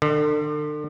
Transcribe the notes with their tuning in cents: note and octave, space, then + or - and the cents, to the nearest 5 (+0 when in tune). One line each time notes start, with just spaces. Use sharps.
D3 +35